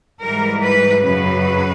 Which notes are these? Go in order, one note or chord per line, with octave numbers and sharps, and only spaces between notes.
G#2 E3 G3 A#4
B4
F#2 C#3 F#3 B4